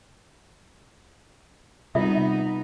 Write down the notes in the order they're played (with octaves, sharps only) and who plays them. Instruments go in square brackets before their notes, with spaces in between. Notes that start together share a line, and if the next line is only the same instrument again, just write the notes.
[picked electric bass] C3 [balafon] G3 [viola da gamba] B3 D#4 [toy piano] F4 E5